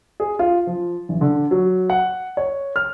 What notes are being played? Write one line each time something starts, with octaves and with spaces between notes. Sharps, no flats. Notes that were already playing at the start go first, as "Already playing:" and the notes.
G#4
F4
F3
A1
D3
F#3
F#5
C#5
F6